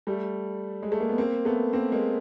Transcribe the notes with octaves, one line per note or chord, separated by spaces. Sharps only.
G3 A3
G#3
A3
A#3
B3
A#3 C4
A3 B3
A#3 C4
G#3 A#3